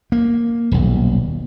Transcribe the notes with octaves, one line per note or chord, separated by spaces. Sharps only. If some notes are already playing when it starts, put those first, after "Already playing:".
A#3
D#1 B1